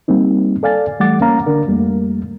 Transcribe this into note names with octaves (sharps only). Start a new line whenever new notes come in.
G3 A#3 C4 D#4
A4 D5 F5 G#5 A6
E3 G3 A3 F#5 D6 A6
A#3 C#4 F5 A#5
D3 D4 A#4
F2 G3 A3 A#3